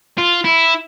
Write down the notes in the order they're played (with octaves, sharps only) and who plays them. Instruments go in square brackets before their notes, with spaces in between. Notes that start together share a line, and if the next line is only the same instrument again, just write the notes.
[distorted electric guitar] F4
E4